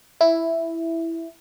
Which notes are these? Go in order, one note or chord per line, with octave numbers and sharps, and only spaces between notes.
E4